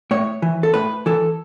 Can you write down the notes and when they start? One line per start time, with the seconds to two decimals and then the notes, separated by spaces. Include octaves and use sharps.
0.11 A2 C#5
0.42 E3
0.63 A4
0.74 A2 B4
1.06 E3 A4